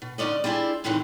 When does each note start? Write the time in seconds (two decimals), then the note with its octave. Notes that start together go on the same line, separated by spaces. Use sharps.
0.02 B2
0.18 D2 G#2 F3 C#4 D5 D#5
0.44 G3 D4 E4 F4 G#4
0.84 A2 C3 D#3 E3 F#3 G#3